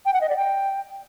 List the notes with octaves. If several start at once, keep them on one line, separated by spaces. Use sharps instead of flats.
G5
F#5
D#5
D5
G5